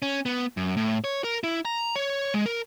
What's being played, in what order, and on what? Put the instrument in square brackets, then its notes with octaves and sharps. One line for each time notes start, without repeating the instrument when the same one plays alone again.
[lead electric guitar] C#4
B3
F#2
A2
C#5
A#4
E4
A#5
C#5
G#3
A#4